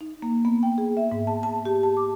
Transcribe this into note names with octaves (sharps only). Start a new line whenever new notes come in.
D#4
A#3
B3
G5
G#4
E5
G#2
A5
A5
G4
A5
D6